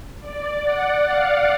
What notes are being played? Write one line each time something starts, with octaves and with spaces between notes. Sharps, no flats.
D5
F#5
F5